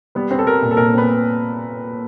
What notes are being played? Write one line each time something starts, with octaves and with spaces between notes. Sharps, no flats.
G3 B3 B4
C4
A4
G3 A#4
A#2
A4
A#2 A#4
B3 C4 B4